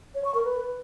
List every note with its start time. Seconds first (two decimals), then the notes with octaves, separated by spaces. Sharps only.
0.15 C#5
0.25 C#6
0.34 A#4
0.44 B4